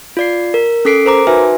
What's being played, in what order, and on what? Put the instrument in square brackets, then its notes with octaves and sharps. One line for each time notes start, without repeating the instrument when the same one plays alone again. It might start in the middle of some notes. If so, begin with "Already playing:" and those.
[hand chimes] F4 D5 C7
A#4
C#4 A4 D6 B6 C7 D7
A#4 C5 A#5 D6
D#4 F#4 B4 E5 G#5